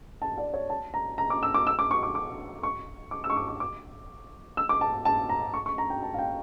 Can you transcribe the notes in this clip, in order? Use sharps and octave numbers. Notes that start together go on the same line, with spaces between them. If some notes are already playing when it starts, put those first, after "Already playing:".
A5
D5
C#5
A5
A#5
A#5
D6
E6
D6
E6
D6
C#6
D6
D6
C#6
D6
E6
C#6
D6
D6
D6
E6
D6
A5
A5
A#5
C#6
C#6
A#5
G5
A5
F5
G5